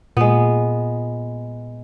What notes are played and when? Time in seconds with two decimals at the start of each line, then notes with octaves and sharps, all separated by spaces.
0.17 A#2 G#3 B3